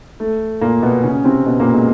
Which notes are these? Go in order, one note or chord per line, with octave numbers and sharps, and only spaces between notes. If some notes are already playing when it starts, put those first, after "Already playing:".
A3
A#2 A#3
B2 B3
C#3 C#4
C3 C4
B2 B3
A#2 A#3
G#3